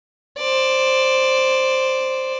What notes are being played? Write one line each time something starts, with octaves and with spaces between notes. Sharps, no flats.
C5 D5